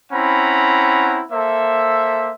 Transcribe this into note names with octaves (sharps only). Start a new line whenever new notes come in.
C4 C#4 E4 F#5 A#5 B5
A#3 A4 C5 E5